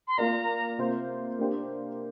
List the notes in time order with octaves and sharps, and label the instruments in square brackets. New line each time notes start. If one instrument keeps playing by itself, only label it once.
[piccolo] C6
[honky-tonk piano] A#3 F4 A#4 D5 [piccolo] A#5
[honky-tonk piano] C3 A#3 F4 C5
A#3 D4 G4 C5